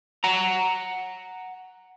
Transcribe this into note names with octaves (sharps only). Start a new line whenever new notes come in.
F#5 A#5